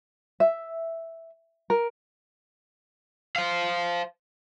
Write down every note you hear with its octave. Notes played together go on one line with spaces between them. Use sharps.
E5
A#4
C5 F5